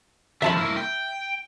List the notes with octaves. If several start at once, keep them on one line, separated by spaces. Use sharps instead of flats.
D3 F3 E5 A5 B5
A#3 E4
G5